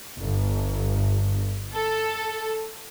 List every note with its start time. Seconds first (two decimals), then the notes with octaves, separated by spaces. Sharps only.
0.19 G1
1.73 A4